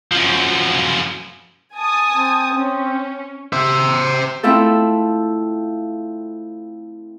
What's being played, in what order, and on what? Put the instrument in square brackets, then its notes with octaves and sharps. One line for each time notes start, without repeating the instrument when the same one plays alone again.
[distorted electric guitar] F#2 F3
[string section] G#5 A5 D#6
[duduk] C4
[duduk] C4 [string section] C#4
[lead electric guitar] C5 E5
[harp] A3 C4 E4 F4 A4